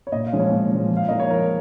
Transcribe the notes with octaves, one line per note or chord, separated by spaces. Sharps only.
C#5
A#2 D#5
F5
F3 G#3 C#4
C#5
A#2
F3 G#3 C#4
F3
F5
A#3 D#4 D#5
C#5
F3 A#4